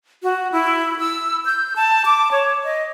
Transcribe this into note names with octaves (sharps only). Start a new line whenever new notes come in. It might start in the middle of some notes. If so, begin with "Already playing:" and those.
F#4
E4
E6
G6
A5
D6
C#5
D#5